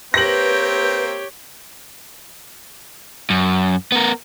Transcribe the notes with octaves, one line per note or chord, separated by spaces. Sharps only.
A#3 C4 G4 B4 C#5 G6 A#6 F#7
F#2
B3 A#4